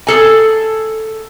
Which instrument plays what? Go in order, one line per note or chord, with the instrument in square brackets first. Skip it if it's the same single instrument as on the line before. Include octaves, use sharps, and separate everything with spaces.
[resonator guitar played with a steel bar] G#4 A4 G#5